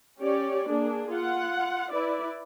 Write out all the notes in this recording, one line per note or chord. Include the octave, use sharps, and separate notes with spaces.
C#4 G4 C#5 D5
A#3 D4 G#4
F4 F#5
E4 B4 D5